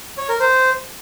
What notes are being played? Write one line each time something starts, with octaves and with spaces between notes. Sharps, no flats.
C#5
A#4
C5